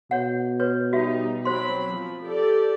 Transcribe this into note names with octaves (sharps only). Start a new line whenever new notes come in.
B2 C#5 F#5
B4 C#5
G3 D#4 F#4 E5
F#3 C4 C5 B5 C6
F3
G4 A4 D5